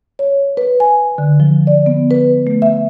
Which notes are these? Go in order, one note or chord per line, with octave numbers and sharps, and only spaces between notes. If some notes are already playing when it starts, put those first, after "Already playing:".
C#5
B4
G#5
D3
F3
D5
B3
B4
A3
E5